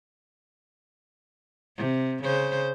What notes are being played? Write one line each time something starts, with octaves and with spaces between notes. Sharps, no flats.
C3
C#3 C5